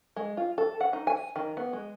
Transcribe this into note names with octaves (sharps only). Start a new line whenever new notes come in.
G#3
F4
A4
F#5
D#4
G#5
D#3
B3
G#3